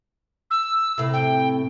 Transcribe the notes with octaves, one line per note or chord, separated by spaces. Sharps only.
E6
A2 C3
G5